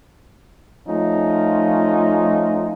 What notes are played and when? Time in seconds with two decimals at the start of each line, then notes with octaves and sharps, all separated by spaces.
0.87 F3 A3 C#4 D#4 F4